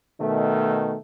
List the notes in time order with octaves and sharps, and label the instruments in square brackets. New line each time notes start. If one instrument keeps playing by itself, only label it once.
[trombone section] B2 D#3 A3